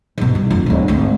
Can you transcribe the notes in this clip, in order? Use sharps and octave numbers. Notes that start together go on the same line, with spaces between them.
G#2 B2
G2
F1 F4
D1 E3
G#1 D2